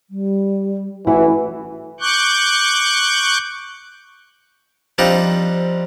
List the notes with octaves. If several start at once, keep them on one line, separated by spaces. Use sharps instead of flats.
G3
A1 E3 E4 F#4
C#6 D6 F#6 G6
F3 G3 C4 D4 D#4